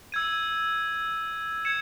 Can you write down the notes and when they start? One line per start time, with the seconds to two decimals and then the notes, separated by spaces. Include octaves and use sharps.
0.12 E6 G#6 D#7
1.65 G#6 C#7 E7